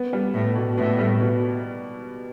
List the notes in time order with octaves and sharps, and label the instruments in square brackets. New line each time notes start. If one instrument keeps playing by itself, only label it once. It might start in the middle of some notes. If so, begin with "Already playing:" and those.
Already playing: [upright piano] B3
G3
[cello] A2 [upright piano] B3
[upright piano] B2
[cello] A2 [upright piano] B3
[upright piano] G3
B2